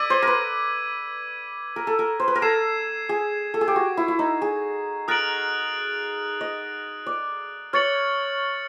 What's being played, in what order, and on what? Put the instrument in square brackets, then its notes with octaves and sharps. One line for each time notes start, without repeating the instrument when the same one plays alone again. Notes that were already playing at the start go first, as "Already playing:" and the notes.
Already playing: [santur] D5 [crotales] E6 G#6 B6 D#7
[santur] C5
A#4 B4
A#4
A4
A#4
C5
B4
A#4
[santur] A4 [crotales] G#6 C7 E7
[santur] G#4
A4
G#4
G4
F#4
E4
E4
D#4
G#4
[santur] A#4 [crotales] D#6 F#6 A6 D7 F#7
[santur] D#5
D5
[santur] C#5 [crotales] F6 A6 C#7 F#7